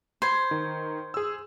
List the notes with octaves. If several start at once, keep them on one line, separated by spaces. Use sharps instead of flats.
C5 B5 G#6
D#3
G#4 E6